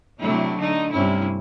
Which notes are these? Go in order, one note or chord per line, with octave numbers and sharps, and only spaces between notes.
C3 F#3 A3 D4 E4
D3 A3 D#4
G2 C3 C#4 E4